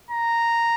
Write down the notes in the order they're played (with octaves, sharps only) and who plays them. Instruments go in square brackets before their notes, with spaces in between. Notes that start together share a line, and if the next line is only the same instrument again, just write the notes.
[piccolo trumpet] A#5